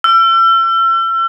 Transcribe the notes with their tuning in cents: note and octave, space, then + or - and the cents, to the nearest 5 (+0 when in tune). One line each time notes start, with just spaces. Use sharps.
E6 +40